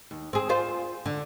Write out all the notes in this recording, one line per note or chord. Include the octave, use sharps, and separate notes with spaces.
D#2
C4 G#4
F4 C5
D3